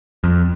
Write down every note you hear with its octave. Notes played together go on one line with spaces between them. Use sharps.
F2